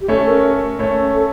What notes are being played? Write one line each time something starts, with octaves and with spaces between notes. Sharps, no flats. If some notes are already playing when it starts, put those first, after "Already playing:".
G4
A3 C#4 A4
A#4
A3 C#4
A4